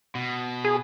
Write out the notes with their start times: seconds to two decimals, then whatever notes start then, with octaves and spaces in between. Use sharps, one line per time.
0.15 B2
0.65 G#4